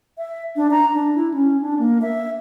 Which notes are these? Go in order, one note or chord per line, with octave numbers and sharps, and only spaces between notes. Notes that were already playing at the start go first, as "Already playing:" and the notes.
E5
D4
A#5
D4
E4
C#4
D4
A#3
E5